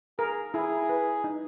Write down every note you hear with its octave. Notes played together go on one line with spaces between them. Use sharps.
G#4 A#4
E4 G#4
B4
D#4